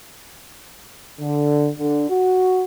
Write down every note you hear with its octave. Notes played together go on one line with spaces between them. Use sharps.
D3
D3
F#4